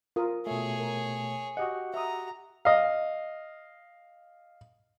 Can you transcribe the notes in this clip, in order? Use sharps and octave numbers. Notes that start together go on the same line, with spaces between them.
F4 A#4 D#6
B2 A3 G#4 C#5
A#4
F#4 G4 D#5 F#5
E5 A#5 D#6
D#5 F5